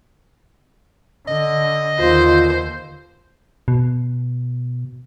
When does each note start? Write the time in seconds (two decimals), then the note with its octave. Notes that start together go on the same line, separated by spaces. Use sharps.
1.28 D3 D#5
1.99 D#2 D3 F4 C5
3.68 B2